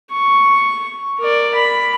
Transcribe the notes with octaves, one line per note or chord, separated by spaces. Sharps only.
C#6
A#4 D5
B5